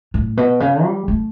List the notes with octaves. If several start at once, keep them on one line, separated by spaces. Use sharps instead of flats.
A2
B2
C#3
G3
A3